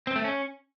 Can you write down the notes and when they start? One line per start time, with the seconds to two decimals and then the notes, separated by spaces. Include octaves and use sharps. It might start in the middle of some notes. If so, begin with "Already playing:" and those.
0.07 C4
0.16 A3
0.24 C#4